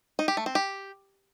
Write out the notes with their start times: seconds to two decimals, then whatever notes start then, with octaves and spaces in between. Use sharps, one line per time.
0.19 D#4
0.28 G4
0.37 A3
0.46 C4
0.55 G4